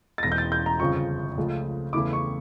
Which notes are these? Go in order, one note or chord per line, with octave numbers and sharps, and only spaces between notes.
A6
E1 E2 E3 A#6
G6
A6
G6
A#5
G1 F2 C#3 F3 C#6
C#2 C#3 F3 A3
E2 C#3 E3 A3 E4 D6
C#6